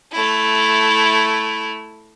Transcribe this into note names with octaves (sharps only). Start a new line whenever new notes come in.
A3 E4